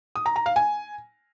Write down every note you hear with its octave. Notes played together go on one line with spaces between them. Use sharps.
D#6
A#5
A#5
F5
G#5